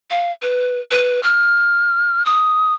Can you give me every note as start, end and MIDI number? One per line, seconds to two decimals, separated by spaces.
0.10 0.31 77
0.42 0.80 71
0.91 1.22 71
1.23 2.23 89
2.26 2.74 87